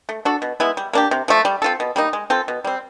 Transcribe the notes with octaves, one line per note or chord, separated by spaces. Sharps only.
A3
D4 F#4 A4
B2
G#3 B3 E4
G3
A#3 D4 G4
C3
F3 A3
G3
C4 F4 A4
B2
G3 A#3 D#4
G#3
C4 F4 A4
B2
G3 C4